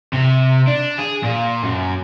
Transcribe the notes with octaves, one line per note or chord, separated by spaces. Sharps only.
C3
D4
G#4
A#2
F#2